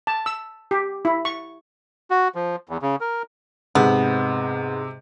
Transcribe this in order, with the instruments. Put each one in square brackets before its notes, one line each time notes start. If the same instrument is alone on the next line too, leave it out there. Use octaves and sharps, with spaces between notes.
[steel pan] A5
E6
G4
E4
C#6
[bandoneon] F#4
F3
E2
C#3
A#4
[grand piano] G#2 [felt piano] C3 [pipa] B3